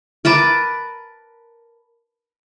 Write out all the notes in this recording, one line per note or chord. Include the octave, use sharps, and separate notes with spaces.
A#4 B4 A5 D6